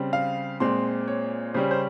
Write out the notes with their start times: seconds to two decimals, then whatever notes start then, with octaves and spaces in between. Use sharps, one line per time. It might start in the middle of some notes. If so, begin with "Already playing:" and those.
Already playing: C#3 G3 C4
0.13 F5
0.60 A#2 G#3 C4 C6
1.08 C#5
1.54 C#3 G3 C#4 C5
1.71 C5